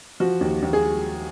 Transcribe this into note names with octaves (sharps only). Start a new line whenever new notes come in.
F3 F#4
D#2
D#2
G#4